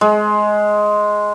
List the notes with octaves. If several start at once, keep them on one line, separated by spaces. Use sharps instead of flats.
G#3